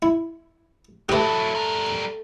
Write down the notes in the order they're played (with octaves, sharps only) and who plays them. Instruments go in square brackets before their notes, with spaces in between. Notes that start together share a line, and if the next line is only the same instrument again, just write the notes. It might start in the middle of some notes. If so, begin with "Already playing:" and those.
[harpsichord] E4
[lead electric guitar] F#3 E4 [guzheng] A3 D#5 [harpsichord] G4 B4
[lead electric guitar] G3 A#4